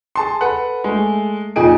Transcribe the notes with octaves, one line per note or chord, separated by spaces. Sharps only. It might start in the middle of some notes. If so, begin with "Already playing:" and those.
G#4 A5 C6
A4 B4 F#5
G#3 A3
F2 A#2 D#4 G#4 D#5 D7